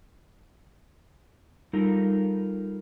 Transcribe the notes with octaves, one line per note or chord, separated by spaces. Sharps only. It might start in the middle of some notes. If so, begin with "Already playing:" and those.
G3 D#4 F4 A4 A#4